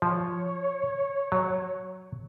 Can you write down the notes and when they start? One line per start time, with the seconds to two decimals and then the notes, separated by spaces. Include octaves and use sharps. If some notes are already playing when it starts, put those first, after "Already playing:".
0.02 F3 C#5
1.32 F#3